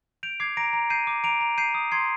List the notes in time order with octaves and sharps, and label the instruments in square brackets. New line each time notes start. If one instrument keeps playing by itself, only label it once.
[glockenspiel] G6 D7 F7
D6 G#6 C7
A#5 A#6 D7
A#5
G6 C7 D#7
D6
A#5 D7 F7
A#5
G6 C7 D#7
D#6
C6 G#6 C7